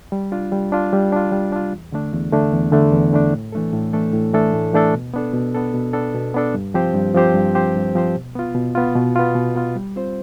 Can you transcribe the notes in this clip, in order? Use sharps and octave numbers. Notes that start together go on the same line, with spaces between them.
G3
D4 F4
G3
D4 F4
G3
D4 F4
G3
D4 F4
E2
D3 A3 D4
E2
D3 A3 D4
E2
D3 A3 D4
E2
D3 A3 D4
A2
E3 A3 D4 A4
A2
E3 A3 D4 A4
A2
E3 A3 D4 A4
A2
E3 A3 D4 A4
B2
B3 D4 A4
B2
B3 D4 A4
B2
B3 D4 A4
B2
B3 D4 A4
G2
F3 C4 G4 C5
G2
F3 C4 G4 C5
G2
F3 C4 G4 C5
G2
F3 C4 G4 C5
B2
B3 F4
B2
B3 F4
B2
B3 F4
B2
B3 F4
G3
C4 F4 C5